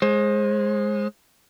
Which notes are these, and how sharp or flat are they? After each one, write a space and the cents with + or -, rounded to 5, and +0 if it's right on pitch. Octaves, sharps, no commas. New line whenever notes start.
G#3 +0 C5 +30